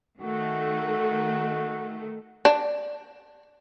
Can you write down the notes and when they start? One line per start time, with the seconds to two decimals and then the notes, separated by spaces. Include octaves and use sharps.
0.21 D#3 A3 F#4
2.45 D4